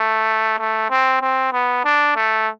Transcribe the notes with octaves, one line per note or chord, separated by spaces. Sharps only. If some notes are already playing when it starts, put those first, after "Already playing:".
Already playing: A3
A3
C4
C4
B3
D4
A3